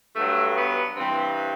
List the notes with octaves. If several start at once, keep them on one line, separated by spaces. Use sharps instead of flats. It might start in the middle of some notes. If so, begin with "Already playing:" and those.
G2 F#3 A3
B3
G2 E3 G3 C4